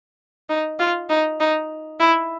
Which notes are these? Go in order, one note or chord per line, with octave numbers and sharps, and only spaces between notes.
D#4
F4
D#4
D#4
E4